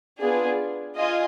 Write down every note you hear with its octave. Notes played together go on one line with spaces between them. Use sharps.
B3 D4 F4 G#4
F4 D#5 G#5